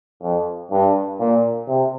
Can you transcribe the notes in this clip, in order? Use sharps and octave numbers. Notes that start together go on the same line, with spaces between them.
F2
G2
A#2
C3